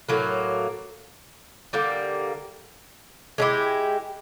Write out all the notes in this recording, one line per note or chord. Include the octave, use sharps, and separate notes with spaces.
A2 F#3 A#3
D3 G3 A#3
G#3 C#4 E4 G4